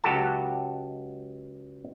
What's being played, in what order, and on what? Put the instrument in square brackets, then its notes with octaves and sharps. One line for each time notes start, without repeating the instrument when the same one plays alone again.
[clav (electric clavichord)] C#2 F#3 F#4 G4 A4 A5